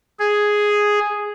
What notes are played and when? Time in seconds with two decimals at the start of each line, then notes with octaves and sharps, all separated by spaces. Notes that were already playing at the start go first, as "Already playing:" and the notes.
0.19 G#4